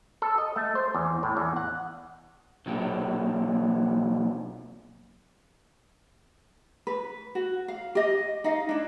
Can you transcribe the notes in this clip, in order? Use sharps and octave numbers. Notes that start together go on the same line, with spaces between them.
A4
D#5
A3
C5
E2
A2
E2
F#5
B1 A#2
B4
F#4
F5
G4 D#5
D#4 D#5 F5
D4 E4